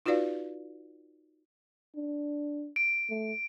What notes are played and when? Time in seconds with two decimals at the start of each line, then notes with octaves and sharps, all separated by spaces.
0.06 D#4 F4 F#4 B4 D5 F5
1.96 D4
2.76 D7
3.10 A3